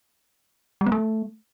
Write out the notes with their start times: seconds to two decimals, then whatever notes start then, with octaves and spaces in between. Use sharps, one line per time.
0.81 G3
0.86 B3
0.92 A3